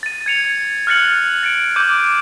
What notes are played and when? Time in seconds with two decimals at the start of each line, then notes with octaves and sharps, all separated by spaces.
0.03 A6 D#7
0.26 G#6 C#7 F7
0.87 F6 F#6 A6 C#7 F#7
1.43 A6 C#7 D7
1.76 D6 G6 D#7 F#7